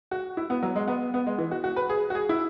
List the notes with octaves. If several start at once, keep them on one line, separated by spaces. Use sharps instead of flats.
F#4
E4
B3
F#3
G#3
B3
B3
G#3
E3
F#4
F#4
B4
G#4
F#4
G#4
E4